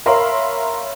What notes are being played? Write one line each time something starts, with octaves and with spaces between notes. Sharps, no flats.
A#4 C#5 E5 F5 B5 C6